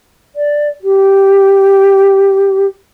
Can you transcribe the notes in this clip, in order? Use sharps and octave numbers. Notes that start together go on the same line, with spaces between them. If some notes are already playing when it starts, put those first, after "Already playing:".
D5
G4